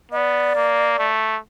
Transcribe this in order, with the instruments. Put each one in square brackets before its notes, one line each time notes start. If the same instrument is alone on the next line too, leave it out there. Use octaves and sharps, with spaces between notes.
[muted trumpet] B3 [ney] D5 D#5
[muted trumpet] A#3
A3